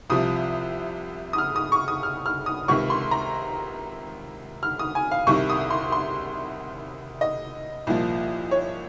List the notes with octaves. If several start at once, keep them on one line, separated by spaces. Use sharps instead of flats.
C2 C3 F3 D#6
D#6
F6
D#6
C#6
D#6
F6
F6
D#6
C#2 C3 D#3 C#6
C6
A#5
F6
D#6
G#5
F5
C2 C3 D#3 C#6
D#6
C6
C6
D#5
C2 A#2 F3
C#5